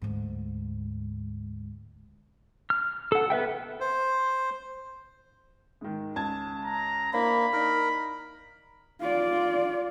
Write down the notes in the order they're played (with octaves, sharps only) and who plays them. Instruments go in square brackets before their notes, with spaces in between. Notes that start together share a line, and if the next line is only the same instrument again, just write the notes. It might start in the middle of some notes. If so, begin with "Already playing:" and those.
[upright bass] D2 G#2
[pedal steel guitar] F6
A4 F#5
B3 B4 E5 G5
[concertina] C5
[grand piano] G#2 D#3
C#2 A5 G#6
[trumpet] A#5
[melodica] A#3 [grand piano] D4 E4 C5 [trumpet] B5
[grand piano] D#4 D5 [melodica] A#4
[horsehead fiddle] F4 D5